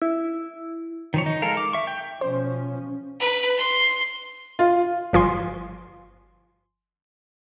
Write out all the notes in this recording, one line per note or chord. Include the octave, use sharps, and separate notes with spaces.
E4
D#3 F3 C#5
D#4
G#3 A4 A#4 F5
D6
E5 C#6
G5
B2 F3 C#4 C5
B4
C6
F4
G1 F3 G#5 C6